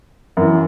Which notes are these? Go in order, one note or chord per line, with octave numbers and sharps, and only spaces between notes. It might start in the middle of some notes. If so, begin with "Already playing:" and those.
F#2 E3